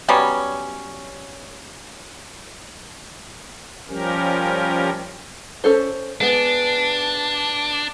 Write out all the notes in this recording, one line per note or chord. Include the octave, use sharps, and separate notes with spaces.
F#3 G3 B3 C#4
F3 G3 C#4 G4 A#4
C#4 A4 C5
G#3 B3 D4